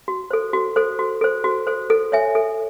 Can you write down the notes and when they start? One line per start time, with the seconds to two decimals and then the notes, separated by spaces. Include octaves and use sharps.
0.08 F#4
0.31 A4 C5
0.53 F#4
0.76 A4 C5
0.99 F#4
1.21 A4 C5
1.44 F#4
1.67 A4 C5
1.90 A4
2.12 C#5 E5 G#5
2.35 A4